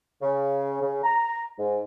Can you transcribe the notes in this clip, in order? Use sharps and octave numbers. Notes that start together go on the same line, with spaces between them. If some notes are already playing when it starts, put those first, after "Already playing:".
C#3
C#3
A#5
G#2